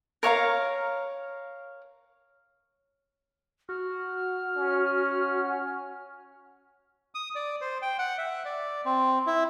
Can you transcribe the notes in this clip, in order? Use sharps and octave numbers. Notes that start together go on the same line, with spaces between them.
A#4 C#5 F5 A#5
F#4 F6
C#4
D#6
D5
C5
G5
F#5
E5
D5
C4
E4